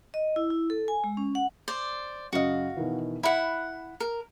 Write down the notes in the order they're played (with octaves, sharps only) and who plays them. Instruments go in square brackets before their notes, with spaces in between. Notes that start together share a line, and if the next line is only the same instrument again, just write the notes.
[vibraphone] D#5
E4
E4
A4
G#5
G#3
C#4
F#5
[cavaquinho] C5 D5
[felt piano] F#2 C#3 D#5 [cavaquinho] F#4 F5
[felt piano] B2 D#3 E3
[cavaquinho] E4 F#5 [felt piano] B5
[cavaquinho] A#4